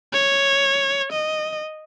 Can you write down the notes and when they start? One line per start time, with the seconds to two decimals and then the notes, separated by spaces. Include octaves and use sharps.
0.13 C#5
1.13 D#5